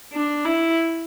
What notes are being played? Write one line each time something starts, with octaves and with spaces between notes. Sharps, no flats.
D4
E4